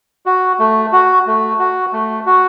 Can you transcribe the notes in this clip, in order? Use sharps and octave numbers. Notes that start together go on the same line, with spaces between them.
F#4
A3
F#4
A3
F#4
A3
F#4